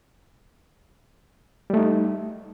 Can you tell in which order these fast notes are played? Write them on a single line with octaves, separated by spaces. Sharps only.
G3 A3 D#4